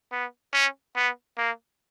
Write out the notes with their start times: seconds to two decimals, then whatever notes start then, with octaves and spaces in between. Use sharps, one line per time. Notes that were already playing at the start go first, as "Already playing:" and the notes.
0.12 B3
0.53 C#4
0.96 B3
1.38 A#3